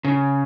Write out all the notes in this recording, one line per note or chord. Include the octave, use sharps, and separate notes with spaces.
C#3